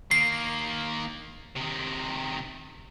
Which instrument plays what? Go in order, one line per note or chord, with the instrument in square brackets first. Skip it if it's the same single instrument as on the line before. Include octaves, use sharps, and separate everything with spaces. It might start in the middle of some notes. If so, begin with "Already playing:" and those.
[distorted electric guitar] D#3 A#3 [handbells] C7
[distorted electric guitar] C3 D#3